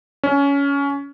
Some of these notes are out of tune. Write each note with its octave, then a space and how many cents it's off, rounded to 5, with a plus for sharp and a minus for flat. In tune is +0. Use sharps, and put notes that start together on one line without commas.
C#4 +20